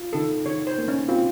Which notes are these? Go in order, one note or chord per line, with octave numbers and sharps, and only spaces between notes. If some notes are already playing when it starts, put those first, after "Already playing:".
Already playing: F4
D#3 A4
D#3 C#5
C5
A#3
C#4
C4 F4